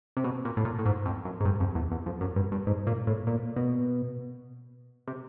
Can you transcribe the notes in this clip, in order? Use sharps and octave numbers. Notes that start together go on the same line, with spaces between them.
C3
B2
A#2
A2
A#2
A2
G#2
F2
F#2
G#2
G2
F2
E2
E2
F2
F#2
G2
G2
G#2
A#2
A2
A#2
B2
C3